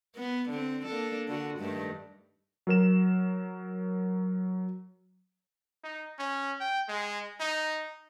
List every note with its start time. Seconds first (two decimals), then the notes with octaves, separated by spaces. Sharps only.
0.16 B3
0.49 D3 C4
0.86 A#3 D4 A4
1.28 D3 F#4
1.60 G2 D#3 A3
2.67 F#3 A#4 E7
5.84 D#4
6.19 C#4
6.60 G5
6.88 G#3
7.40 D#4